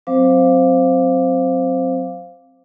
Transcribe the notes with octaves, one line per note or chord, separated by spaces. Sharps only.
F#3 C4 C5 F5 D6